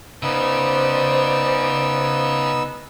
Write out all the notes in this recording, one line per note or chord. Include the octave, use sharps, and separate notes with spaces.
C#3 B3 D#4 C5 D5 E6